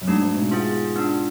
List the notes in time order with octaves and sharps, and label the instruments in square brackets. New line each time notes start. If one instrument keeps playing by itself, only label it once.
[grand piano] F#2
[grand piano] G#2 [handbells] A3 D4 F#4
[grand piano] G#2
G#2 B2
[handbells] B3 F4 G#4
B3 D4 F4